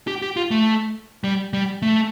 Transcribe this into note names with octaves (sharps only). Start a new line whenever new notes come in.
G4
G4
F4
A3
G3
G3
A3